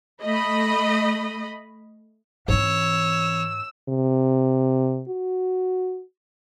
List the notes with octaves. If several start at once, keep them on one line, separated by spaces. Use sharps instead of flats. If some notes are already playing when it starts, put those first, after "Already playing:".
A3 D#5 B5
G#2 E3 C4 C#5 E6
C3
F#4